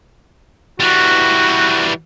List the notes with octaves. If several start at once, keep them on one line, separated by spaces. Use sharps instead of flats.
E3 G3 F#4